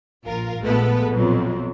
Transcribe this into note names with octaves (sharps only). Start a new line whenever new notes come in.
A#1 F4 A#4
A#1 G#3 A3 B3 A4 B4
A#1 F2 B2 F#3